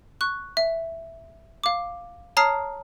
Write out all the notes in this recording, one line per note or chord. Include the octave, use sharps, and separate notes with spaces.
C#6 F#6
E5
F5 D6
C#5 A5 A#5 D#6 F6 C7